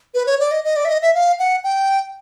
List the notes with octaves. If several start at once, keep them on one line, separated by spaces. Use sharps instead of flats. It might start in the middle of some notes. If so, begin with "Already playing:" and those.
B4
C#5
D5
D#5
D#5
D5
E5
D#5
E5
F5
F#5
G5